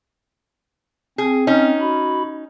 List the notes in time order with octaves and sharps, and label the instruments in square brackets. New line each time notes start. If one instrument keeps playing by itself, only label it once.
[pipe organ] C4 [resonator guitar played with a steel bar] G#4
[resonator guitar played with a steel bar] C#4 D#4
[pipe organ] F#4 B5